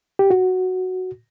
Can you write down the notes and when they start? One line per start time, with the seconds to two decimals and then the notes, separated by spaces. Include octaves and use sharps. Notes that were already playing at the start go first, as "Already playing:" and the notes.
0.19 G4
0.31 F#4